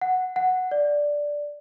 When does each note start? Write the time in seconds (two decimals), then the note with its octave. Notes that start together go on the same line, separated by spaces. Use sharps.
0.01 F#5
0.36 F#5
0.71 D5